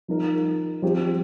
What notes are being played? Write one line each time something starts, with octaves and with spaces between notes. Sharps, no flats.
F3 D#4 A#4
F3 C4 G4